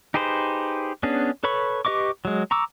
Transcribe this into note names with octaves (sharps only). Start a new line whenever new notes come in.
D#4 G4 G#4 B4 C5
B3 C#4 D4 G#4
A4 B4 C#5 B5 C#6
G4 B4 D#5 C#6 D6
F#3 G#3
A#5 C#6 D6 E6